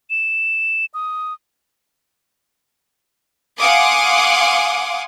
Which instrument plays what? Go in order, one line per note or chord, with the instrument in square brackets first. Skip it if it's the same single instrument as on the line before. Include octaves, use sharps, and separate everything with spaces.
[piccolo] E7
D#6
[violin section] F5 F#5 G#5 C6 D6 D#6